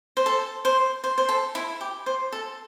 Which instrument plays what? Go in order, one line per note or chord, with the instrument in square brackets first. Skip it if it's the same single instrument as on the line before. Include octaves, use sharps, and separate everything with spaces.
[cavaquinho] C5
A4
C5
C5
C5
A4
E4
G4
C5
A4